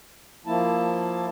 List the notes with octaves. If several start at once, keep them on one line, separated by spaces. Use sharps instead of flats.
F3 A#3 E4 A5